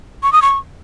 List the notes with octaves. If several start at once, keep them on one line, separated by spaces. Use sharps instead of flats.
C#6
D#6
C#6